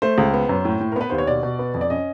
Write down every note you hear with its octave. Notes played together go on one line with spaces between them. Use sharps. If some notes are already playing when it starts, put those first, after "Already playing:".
A3 C5
C#2
B3
F#2
A2
A2
A#4
B3 B4
D#2 C5
C#5
B2 D5
B2
B3
F2
D5
C#4 D#5